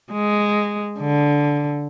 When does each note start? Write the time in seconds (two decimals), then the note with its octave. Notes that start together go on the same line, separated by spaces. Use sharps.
0.13 G#3
0.99 D3